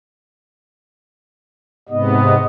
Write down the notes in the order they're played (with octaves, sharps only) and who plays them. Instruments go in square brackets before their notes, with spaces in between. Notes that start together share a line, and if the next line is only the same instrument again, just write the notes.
[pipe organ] G#2 C3 B3 [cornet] D#5